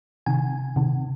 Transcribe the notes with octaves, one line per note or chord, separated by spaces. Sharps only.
C3 D#3 G#5
C3 D#3